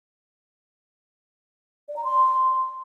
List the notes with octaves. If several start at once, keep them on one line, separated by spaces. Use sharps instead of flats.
D5
A#5
C6